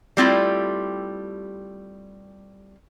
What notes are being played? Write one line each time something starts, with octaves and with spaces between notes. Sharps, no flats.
G3 A3 C4 E4 F4 G4